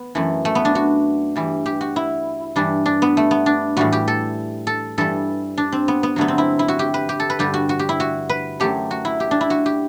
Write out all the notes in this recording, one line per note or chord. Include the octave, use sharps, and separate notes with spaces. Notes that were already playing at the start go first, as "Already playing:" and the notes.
Already playing: B3
F#2 E3 A3
A3
B3
D4
F#4
G2 E3 G3
G4
F#4
E4
G2 E3 G3 D4
D4
B3
A3
B3
D4
A2 E3 G3 F#4
G4
A4
A4
G2 E3 G3 A4
D4
C4
B3
B3
G2 D3 F#3 A3 B3
C4
E4
E4
F#4
G4
B4
G4
A4
B4
G2 D3 G3 G4
F#4
F#4
G4
E4
F#4
B4
F#2 F#3 A3 G4
F#4
E4
G4
D4
E4
F#4
G4